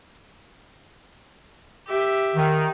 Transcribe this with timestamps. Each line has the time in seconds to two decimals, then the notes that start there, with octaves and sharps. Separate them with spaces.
1.87 G4 E5
2.35 D#3